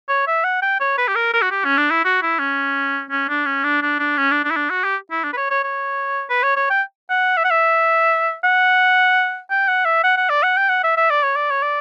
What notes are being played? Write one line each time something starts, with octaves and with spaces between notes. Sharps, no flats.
C#5
E5
F#5
G5
C#5
B4
G4
A#4
A#4
F#4
G4
C#4
D4
E4
F#4
E4
C#4
C#4
D4
C#4
D4
D4
D4
C#4
D4
D4
E4
D4
F#4
G4
E4
D4
B4
C#5
C#5
C#5
B4
C#5
C#5
G5
F#5
E5
F#5
E5
F#5
G5
F#5
E5
F#5
F#5
D5
F#5
G5
F#5
E5
E5
D5
C#5
D5
C#5
D5